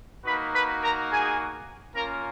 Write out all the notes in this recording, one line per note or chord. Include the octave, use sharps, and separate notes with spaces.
A#3 D#4 F#4 B4 B5
B4 B5
A#4 A#5
G#4 G#5
A#3 C#4 F4 A#4 A#5